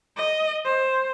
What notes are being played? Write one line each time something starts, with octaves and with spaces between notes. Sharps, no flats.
D#5
C5